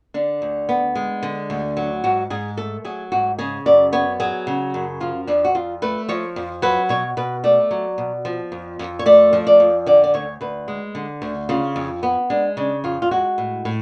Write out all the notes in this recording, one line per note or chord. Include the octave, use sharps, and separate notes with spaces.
D3 D4
D2
B3
G#3
D3
D2
F#3
G#2 F#4
G#2 G#4
A3 A4
F#3 G#4
G#2 F#4
C#3 G#4
F#2 D5
B3 C#5
F#3 G#4
C#3
F#2
F3 F4
F2 D4
F#4
F2 F4
A3 B4
F3 C#5
F2
F#3 B4
B2 C#5
B2 B4
A3 D5
F#3
B2
F3
F2
F2
C#5
A3 D5
F3
D5
F2
D3 D5
D5
D2 C#5
D2 B4
G#3
D3
D2
C#3 F4
F2
B3
G#3 D4
C#3 D4
F2 F4
F4
G#3 F#4
A2
A2